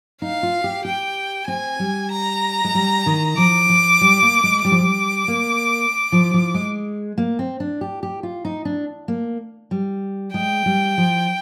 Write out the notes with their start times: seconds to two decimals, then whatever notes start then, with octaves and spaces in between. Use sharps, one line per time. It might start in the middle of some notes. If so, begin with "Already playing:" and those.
0.22 D#4 F5
0.43 F4
0.64 G4
0.85 G4 G5
1.48 C4 G#5
1.79 G3
2.11 A#5
2.64 G#3
2.75 G3
3.06 D#3
3.37 F3 D6
3.69 F3
4.01 G3
4.22 A#3
4.44 G#3
4.64 G3 D6
4.72 F3
4.80 G3
5.28 A#3
6.12 F3
6.34 F3
6.54 G#3
7.18 A#3
7.39 C4
7.60 D4
7.81 G4
8.03 G4
8.23 F4
8.45 D#4
8.65 D4
9.08 A#3
9.71 G3
10.34 G#3 G5
10.66 G3
10.98 F3